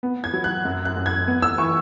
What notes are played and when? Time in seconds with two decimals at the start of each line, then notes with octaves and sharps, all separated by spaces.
0.03 B3
0.24 G#6
0.33 F#3
0.44 F#6
0.65 F#2
0.85 F#6
0.97 F#2
1.06 G#6
1.27 B3
1.42 E6
1.58 E3 C#6